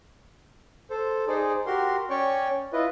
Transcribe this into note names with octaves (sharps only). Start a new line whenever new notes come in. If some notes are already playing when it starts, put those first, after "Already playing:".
A4 C5
D#4 G#4 C5 D5
F#4 G4 A#4 C6
C#4 C#5 D5 G5 C#6
E4 F4 B4 D#5